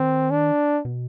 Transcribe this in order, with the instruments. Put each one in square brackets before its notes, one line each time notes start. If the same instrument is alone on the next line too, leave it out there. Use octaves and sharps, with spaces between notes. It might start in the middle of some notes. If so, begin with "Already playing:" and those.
Already playing: [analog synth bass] D#3 [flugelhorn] C4
[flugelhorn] D4
[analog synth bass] B2